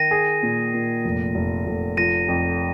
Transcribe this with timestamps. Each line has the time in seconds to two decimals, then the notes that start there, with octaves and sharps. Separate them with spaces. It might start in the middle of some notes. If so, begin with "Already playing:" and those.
Already playing: D#3 A#6 D#7
0.11 G#4
0.43 A#2
0.74 A#2
1.05 F1
1.35 F1
1.67 F1
1.97 F3 A#6 D#7
2.28 F2